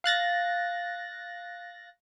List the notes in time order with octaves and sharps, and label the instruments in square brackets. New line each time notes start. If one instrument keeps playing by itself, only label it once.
[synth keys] F5 F#6 A6 A#6